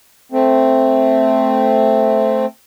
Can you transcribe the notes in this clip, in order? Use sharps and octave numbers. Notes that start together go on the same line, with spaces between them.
A3 C4